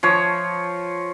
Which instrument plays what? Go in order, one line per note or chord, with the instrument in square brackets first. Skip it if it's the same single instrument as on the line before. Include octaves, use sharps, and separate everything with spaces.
[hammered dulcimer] F3 C#5